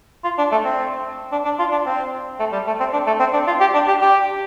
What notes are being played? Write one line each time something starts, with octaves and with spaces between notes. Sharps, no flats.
F4
D4
A3
C4
D4
D4
F4
D4
C4
A3
G3
A3
C4
D4
A3
C4
D4
F4
G4
D4
G4
G4